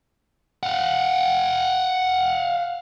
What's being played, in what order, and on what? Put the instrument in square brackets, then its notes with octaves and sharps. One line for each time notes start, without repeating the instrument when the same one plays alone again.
[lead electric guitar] F5 F#5